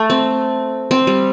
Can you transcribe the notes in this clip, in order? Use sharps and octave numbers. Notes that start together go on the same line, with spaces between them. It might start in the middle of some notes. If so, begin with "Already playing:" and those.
Already playing: A3
C4
C4
G3